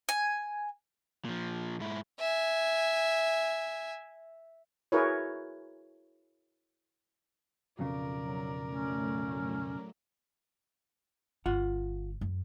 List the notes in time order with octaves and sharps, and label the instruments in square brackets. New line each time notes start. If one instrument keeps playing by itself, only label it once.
[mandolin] G#5
[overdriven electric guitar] A#2 F3
G#2 E4
[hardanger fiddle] E5 G#5
[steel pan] E4 F#4 G#4 A#4 B4 C#5
[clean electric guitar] B1 F2 C#3 [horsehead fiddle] A#4 D5
[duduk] F#3
[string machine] A2 F#3 A3 [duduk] C#4
[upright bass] G1 [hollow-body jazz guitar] F4 F#5
[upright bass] F#2